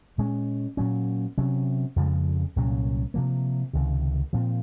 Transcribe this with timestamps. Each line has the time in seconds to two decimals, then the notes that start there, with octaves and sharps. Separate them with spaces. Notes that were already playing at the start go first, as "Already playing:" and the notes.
0.18 A#2 G#3 C#4
0.77 A#2 F#3 C#4
1.38 C3 F#3 C#4
1.96 F2 C#3 F3 G#3
2.56 C2 A#2 F#3 C#4
3.14 C3 F3 A#3
3.73 C#2 C3 D#3
4.33 A#2 F3 C4